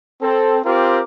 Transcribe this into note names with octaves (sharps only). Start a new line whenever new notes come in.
C4 A4
C4 F4 G4 A#4 D6